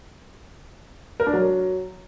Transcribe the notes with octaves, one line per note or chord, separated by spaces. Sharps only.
A#4
D4
F#3